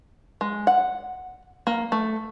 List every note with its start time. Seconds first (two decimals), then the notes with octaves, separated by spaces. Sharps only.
0.41 G#3
0.67 F#5
1.67 A#3
1.92 A3